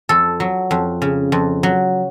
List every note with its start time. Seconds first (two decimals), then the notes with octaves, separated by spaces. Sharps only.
0.09 F2 A4
0.40 F#3
0.71 F2
1.02 C#3
1.32 F2
1.63 F#3